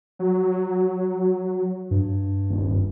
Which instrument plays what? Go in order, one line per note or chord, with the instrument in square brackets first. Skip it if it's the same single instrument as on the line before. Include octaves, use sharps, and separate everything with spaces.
[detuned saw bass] F#3
[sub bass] G2
[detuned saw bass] D#1